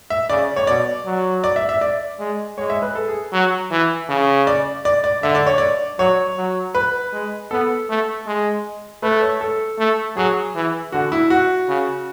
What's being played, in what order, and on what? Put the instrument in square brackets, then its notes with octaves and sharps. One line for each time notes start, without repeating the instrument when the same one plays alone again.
[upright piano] E5
[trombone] C#3 [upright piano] D5
[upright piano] C#5
[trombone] B2 [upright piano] D5
[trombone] F#3
[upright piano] D5
E5
E5
D5
[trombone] G#3
[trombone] G#3 [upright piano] C#5
[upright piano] E5
B4
A4
G#4
[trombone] F#3
E3
C#3
[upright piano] D5
D5
D5
[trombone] D3 [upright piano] E5
[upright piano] D5
C#5
D5
[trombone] F#3 [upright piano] C#5
[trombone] F#3
[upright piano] B4
[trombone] G#3
[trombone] B3 [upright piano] A4
[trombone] A3
G#3
[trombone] A3 [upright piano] B4
[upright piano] C#5
A4
[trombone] A3
[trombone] F#3 [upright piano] G#4
[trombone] E3
[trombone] D3 [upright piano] F#4
[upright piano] E4
F#4
[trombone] C#3